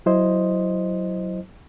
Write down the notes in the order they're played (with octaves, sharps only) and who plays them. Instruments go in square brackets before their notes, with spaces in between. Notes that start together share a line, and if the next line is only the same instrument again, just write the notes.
[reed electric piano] F#3 E4 C5 D#5